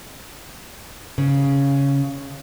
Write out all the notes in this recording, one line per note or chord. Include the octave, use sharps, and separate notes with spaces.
C#3